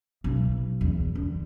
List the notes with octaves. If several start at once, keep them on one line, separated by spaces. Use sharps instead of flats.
B1
E2
D3